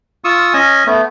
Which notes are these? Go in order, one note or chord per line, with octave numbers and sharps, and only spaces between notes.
F4 C#6 D#6 E6
C#4 D#5 G#5
A3 B3